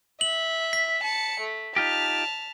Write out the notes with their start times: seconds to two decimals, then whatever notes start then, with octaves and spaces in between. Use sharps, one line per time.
0.21 E5 F#7
0.73 B6
1.03 A5 C#7
1.40 A3
1.76 D#4 F4 G4 A5 F6